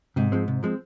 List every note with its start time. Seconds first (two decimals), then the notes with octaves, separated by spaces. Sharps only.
0.16 G#2 C3
0.32 F3 G#3 C4
0.48 C3
0.63 F3 G#3 C4